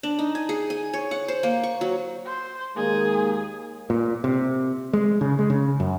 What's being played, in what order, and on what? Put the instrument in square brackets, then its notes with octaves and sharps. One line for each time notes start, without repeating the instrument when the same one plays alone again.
[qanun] D4
D#4
G#5
G#4
G#5
C#5
F#5
C5
A#3
C#6
F#3
[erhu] C5
[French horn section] D#2 G#3 A#3 [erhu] G#4
[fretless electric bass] A#2
C3
G#3
C#3
G#3
C#3
F#2